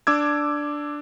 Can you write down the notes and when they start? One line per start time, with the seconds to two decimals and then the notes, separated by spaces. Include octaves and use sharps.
0.07 D4 D6 E6 G#6